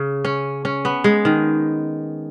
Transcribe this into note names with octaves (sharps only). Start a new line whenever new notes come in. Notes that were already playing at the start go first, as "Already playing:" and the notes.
Already playing: C#3
C#4
C#4
B3
G#3
D#3